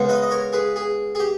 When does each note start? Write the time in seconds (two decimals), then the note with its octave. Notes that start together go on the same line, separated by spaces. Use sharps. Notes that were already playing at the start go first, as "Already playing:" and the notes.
Already playing: C#3 G#3 B3 D#4
0.09 B4 D#5
0.22 D#5
0.31 A#4 C#5
0.53 G#4 B4
0.76 G#4
1.15 G#4
1.20 G4